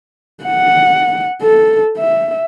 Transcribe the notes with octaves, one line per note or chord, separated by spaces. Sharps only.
F#5
A4
E5